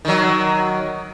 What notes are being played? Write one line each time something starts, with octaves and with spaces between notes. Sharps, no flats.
D#3 F#3